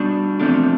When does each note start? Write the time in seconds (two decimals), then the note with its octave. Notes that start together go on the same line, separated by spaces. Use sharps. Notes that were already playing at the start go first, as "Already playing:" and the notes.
Already playing: B2 G3 D4
0.40 E2 C3 F3 A3 D4